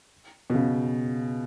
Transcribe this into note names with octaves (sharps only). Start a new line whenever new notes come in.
B2
C#3